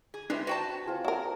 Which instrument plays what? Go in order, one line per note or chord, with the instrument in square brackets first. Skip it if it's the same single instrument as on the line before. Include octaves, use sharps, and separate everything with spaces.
[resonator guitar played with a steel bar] G#4
[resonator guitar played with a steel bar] G3 G#3 [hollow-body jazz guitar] D4 B4 E5
[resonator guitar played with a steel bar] F#4 G5 A5 [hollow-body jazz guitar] B4 [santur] C5
[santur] C4 F4 G#4
[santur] F#3 [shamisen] E4 A#4